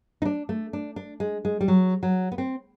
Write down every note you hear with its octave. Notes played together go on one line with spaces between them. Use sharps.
D#4
D4
A3
D4
D4
G#3
G#3
G3
F#3
F#3
B3
C4